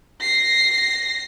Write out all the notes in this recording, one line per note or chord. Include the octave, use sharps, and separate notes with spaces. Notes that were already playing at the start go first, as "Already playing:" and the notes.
A#6 C7